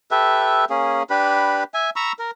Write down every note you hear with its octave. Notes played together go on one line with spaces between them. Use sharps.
G4 A4 B4 E5
A#3 C#4 G#4
D4 G4 B4 B5
E5 G#5
A#5 B5 C#6 E6
A#4